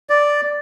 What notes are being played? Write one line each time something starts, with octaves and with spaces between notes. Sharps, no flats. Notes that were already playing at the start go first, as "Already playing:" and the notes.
D5